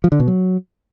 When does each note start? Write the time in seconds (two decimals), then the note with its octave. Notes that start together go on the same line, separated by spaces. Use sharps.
0.04 F3
0.12 D3
0.20 B2
0.28 F#3